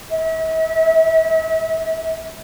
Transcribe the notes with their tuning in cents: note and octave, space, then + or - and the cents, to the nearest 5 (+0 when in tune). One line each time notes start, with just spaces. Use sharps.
E5 -40